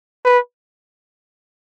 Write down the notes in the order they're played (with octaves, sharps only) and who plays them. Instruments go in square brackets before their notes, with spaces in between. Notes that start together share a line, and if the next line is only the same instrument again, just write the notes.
[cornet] B4